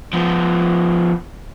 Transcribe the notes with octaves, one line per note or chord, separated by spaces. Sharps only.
F3 B3